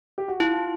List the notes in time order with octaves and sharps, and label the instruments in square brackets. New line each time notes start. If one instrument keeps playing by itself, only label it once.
[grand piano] G4
F#4
[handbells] E4 [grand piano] F4